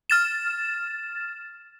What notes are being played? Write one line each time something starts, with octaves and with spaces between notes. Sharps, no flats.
F6 A6 E7